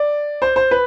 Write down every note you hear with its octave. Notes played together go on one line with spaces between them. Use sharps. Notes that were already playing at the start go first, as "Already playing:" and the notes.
Already playing: D5
C5
C5
B4